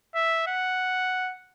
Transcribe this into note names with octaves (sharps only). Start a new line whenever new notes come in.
E5
F#5